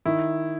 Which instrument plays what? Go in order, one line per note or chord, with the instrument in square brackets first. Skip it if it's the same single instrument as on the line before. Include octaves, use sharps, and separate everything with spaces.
[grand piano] D#3 E4